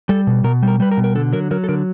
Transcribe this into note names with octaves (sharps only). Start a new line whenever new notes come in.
G3 A4
B2
B2 A#4
G3
A#4
G3 B4
A#4
B2
A#4
D3 A4
F#3 A#4
F#3 A#4
A4
D3 A#4